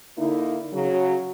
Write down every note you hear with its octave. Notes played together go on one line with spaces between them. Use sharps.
D3 A#3 D#4 E4
C#3 F#3